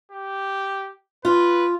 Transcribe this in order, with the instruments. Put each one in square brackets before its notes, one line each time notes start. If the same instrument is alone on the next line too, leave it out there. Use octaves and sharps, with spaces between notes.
[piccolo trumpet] G4
[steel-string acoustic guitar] F4 [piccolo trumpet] B4